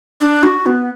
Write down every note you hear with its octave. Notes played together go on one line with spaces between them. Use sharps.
D4
F#4
B3